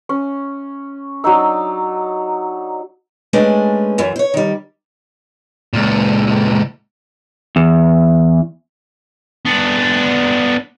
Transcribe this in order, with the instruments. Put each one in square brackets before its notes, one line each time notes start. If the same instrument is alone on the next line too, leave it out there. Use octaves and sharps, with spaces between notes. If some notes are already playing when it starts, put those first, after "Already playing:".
[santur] C#4
F#3 D4 D#4 E6
[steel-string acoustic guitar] G#3 A3 C#4 D4 B4
F#2 E3
C5 C#5
D#3 G3
[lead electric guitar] C#2 A#2
[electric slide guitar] E2
[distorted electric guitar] B3 D4